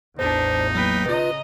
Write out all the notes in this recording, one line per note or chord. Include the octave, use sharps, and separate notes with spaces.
A1 E2 D4 D#4 C5
F#3 A#3 B4 G5
C#3 F4 B4 D#5 A#5